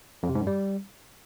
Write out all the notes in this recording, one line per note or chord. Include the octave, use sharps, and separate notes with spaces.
F2
C3
G#2
F#2
G3